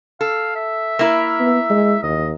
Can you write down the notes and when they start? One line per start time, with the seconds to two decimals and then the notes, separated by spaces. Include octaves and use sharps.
0.21 A4 F5
0.56 E5
0.99 A#3 E4 A#4
1.40 B3
1.70 G#3
2.03 D#2 D#5